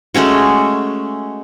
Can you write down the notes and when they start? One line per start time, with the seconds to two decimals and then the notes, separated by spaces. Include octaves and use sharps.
0.14 G#3 A3 C#4 F#4